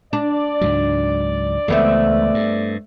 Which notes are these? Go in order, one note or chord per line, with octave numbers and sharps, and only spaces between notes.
D4 D5
C#2 G#2 F#3
C#2 E3 G#3 A3 B3 C4
G2